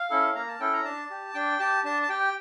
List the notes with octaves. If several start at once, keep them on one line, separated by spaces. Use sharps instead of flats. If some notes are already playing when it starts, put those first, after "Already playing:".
Already playing: F5
C#4 E4 A4
A#3 A#5
A5
C#4 E4 A4 G5
A#5
D4 A5
G4
D4 G5
G4 A5
D4 A5
A5
G4 G5